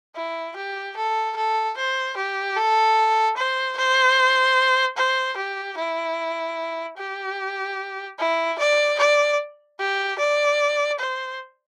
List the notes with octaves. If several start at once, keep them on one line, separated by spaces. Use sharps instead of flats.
E4
G4
A4
A4
C5
G4
A4
C5
C5
C5
G4
E4
G4
E4
D5
D5
G4
D5
C5